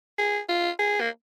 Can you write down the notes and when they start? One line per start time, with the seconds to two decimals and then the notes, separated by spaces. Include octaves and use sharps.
0.18 G#4
0.49 F4
0.79 G#4
1.01 A#3